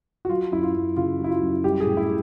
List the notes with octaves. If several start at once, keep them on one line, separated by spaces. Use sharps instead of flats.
F#4
F#3 F4
F#2 E4
F4
F#2
C#3 F4
F#3
E4
F4
F#2
G3 G4
G#4
A2
E4